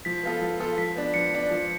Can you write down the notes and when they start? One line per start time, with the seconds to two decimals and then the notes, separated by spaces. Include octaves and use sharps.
0.05 F3 B6
0.23 B3 F4 A4
0.41 F3
0.59 B3 F4 A4
0.78 F3 B6
0.96 B3 D4
1.14 F3 C#7
1.32 B3 D4
1.51 F3